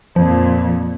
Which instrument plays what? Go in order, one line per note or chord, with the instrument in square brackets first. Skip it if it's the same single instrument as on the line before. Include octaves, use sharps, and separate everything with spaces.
[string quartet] F2 A#2 [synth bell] F3